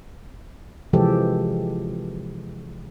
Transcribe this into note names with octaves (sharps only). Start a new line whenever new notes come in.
C3 E3 F3 G#3 G4 A4